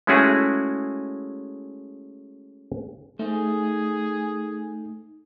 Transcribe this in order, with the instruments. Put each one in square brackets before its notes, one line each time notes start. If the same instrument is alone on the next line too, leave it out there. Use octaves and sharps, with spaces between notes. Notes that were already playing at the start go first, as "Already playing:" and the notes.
[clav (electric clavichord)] G#3 A3 C#4 E4 F#4 G#4
[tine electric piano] A3 [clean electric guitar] D#4 C5 [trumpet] G#4